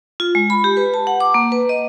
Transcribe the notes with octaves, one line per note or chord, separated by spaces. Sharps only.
F4
G#3
B5
G4
B4
A5
F#5
D6
A#3
B4
D#5